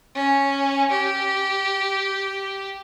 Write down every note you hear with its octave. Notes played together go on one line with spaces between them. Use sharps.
C#4
G4